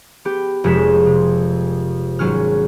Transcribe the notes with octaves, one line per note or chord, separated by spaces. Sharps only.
B3 G4
F1 F2 G#3 C#5 B6 E7
C3
G#1 F#3 C#4 F6